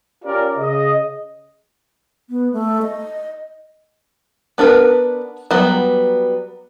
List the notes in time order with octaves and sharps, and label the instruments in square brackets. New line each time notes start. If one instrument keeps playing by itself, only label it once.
[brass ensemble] C#4 F4 G4 A#4 D5
C#3 D#5
[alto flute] B3
A3
D#5
[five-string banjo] B3 D4 A#4 B4
F#3 G3 B3